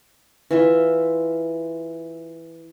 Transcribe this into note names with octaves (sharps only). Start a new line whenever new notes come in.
E3 F4 E5